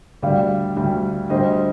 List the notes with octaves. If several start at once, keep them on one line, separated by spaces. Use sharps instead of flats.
D2 D3 G3 D5 F5
D2 D3 G3
D2 D3 G3 C5 D#5